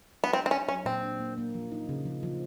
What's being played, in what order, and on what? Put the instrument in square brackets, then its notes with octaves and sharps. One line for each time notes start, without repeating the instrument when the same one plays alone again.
[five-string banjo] B3
[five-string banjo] C4 [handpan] D4
[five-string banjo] C4
[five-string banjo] C#4 [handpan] D4
[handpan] F#3 [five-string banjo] C#4
[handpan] A#2 [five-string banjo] C4
[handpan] D4
A#3
A#3
F3
D#4
C#3
F3
F3